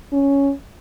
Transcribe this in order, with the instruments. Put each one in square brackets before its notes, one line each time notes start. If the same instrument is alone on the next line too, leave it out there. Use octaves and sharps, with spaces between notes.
[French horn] C#4